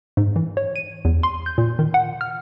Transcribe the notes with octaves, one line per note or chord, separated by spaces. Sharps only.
G#2
E3
C#5
D#7
E2
C6
G6
A#2
D#3
F#5
F6